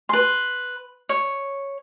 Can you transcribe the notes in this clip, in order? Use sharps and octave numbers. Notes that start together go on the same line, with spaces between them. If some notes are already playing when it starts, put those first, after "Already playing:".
B4 C6
C#5